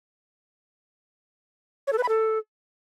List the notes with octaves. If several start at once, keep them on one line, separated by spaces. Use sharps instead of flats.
C#5
A4
B4
B5
A4